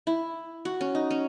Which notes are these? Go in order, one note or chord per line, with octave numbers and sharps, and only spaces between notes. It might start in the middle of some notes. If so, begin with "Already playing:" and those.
E4
F#4
C#4
D#4
C#4